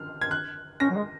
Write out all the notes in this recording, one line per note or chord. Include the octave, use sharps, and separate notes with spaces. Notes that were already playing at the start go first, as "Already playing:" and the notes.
Already playing: F6
G#6
F#6
C#4 A#6
F#3
G#3